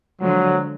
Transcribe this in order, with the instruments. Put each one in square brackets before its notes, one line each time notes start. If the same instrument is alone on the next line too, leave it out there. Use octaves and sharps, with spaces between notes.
[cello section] D3 F3 G#3 [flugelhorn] F#3